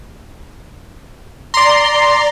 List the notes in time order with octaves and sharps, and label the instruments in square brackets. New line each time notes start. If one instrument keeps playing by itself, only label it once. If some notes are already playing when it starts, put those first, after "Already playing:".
[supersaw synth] D5 A#5 [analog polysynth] C6